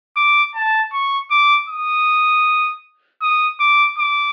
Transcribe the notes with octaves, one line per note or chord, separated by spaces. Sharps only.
D6
A5
C#6
D6
D#6
D#6
D6
D6